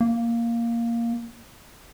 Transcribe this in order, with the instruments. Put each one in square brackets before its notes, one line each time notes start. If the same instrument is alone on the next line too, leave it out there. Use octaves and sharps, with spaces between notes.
[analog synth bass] A#3